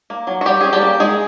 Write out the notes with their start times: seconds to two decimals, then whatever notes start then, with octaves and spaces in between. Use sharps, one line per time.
0.10 A#3
0.27 F#3
0.41 F#4
0.45 F#3 G3 G4
0.61 C#4 G#4
0.73 G3 G4
0.81 A#3
1.00 D#3 G#3 G#4